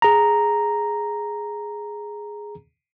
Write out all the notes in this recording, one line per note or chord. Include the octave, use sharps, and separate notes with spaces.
G#4 A#5